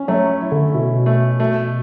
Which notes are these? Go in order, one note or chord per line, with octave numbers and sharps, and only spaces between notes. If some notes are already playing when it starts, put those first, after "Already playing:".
Already playing: C#4
F#3 A3
E4
D3
B2 E4
A3
A3